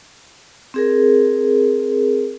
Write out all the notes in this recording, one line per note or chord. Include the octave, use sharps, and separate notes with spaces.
C4 G#4 A#4